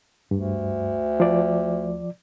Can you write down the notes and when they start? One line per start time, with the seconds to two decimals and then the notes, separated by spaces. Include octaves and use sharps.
0.31 D2 G2
1.20 F3 D5